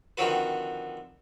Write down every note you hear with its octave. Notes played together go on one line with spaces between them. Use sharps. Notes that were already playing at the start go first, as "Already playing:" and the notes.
D3 D#3 F3 C4 F#4 B4